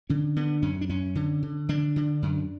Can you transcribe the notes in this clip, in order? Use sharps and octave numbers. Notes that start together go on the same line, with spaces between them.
D3 C#4
D3 B3
F#2 C#4
D4
F#2 C#4
D3
D3
D3 D4
D3
F#2